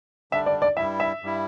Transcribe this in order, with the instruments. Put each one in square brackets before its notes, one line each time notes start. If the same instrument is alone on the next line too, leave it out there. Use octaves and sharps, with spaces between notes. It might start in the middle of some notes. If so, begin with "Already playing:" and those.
[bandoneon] D3 G3 D4 [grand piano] E5
[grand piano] D5
D5
[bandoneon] G2 G3 E4 [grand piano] E5
[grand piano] E5
[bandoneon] G2 G3 E4